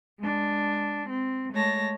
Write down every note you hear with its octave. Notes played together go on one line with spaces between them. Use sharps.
G#3 D4
C4
G#3 A3 C#5 A5 A#6